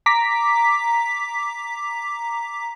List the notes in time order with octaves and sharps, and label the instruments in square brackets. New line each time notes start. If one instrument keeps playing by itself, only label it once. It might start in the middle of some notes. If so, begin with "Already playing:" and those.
[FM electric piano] A#5 D6 B6